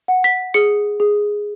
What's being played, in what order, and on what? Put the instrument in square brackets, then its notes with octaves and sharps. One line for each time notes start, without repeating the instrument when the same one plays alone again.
[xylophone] F#5
B6
G#4 C#7
G#4